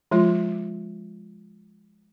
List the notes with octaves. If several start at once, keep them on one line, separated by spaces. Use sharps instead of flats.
F3 G#3 F4